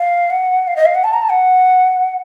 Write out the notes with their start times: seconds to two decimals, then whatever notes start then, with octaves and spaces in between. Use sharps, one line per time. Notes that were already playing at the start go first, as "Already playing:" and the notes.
Already playing: F5
0.30 F#5
0.67 F5
0.76 D#5
0.86 F5
0.95 F#5
1.04 A5
1.13 A#5
1.22 A5
1.30 F#5